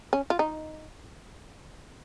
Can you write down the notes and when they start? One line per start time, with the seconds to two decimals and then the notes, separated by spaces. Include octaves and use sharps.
0.13 C#4
0.30 F4
0.39 D#4